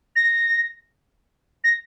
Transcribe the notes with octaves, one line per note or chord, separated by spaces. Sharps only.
A#6
A#6